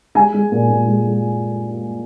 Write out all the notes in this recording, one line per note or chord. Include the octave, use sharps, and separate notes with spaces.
G#3 G#5
G#3
A#2
A#2
G#3
G#3